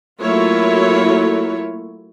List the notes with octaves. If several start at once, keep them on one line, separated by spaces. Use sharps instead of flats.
F#3 A3 A#3 E4 F4 C#5